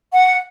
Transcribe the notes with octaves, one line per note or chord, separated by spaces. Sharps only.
F#5